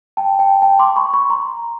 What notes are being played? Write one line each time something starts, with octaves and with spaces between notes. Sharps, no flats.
G5 A5
G5 A5
G5 A5
C6 D6
B5 C#6
B5 C#6
A#5 C6